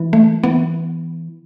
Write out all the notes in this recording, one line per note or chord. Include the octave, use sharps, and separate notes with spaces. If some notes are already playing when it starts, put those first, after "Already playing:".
Already playing: E3
A3
E3 B3